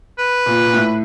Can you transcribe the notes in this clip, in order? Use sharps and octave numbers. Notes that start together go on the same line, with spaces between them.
B4
A#2
A#2
A2